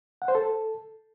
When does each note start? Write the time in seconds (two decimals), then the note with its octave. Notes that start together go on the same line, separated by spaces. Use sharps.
0.22 F#5
0.28 C5
0.35 A4